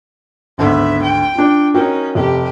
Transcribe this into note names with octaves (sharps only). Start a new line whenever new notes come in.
G#1 D2 B3 E5
G5
D4 F4
C#4 D#4 F#4 A#4 G5
F1 G4